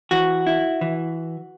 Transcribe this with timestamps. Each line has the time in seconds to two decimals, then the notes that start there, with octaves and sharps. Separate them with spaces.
0.11 E3 F#4
0.47 E4
0.81 E3